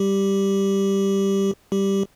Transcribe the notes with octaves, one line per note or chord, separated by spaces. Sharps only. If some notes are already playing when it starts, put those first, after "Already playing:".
Already playing: G3 G4
G3 G4